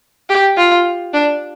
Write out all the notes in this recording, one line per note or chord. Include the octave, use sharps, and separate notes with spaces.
G4
F4
D4